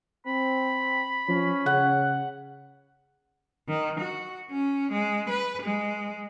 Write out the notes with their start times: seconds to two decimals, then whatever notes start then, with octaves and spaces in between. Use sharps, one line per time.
0.27 C4 B5
1.28 F3 C#4
1.66 C#3 F#5
3.69 D#3
4.00 F#4
4.51 C#4
4.92 G#3
5.30 B4
5.63 G#3